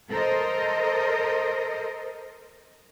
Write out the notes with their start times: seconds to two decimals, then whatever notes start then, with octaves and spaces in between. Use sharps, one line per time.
0.11 A4 A#4 C5 D#5